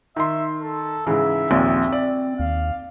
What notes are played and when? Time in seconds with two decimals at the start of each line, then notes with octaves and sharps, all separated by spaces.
0.16 D#3 E5 C6
0.61 A4
1.07 G#2 C#3 E3 E5
1.51 A#1 D#2 A#2 C4
1.92 D5
2.39 D#2 F5